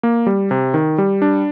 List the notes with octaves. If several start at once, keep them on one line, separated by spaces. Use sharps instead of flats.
A#3
G3
C3
D#3
G3
D4